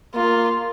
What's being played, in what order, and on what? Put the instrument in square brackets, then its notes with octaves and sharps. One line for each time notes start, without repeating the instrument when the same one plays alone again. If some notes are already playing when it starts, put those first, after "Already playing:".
[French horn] A#3 [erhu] F4